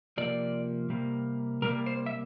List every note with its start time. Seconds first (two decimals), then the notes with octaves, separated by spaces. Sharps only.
0.18 C3 F3 A#3 D5
0.90 C3 G3 A#3
1.62 C3 G3 A#3 A#4
1.86 C5
2.06 E5